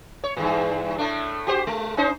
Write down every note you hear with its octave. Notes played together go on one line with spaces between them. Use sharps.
C#5
E2 G2 A#2
A2 A3 D4
F#4 G4 C5
G#3
C#4 D#4 C5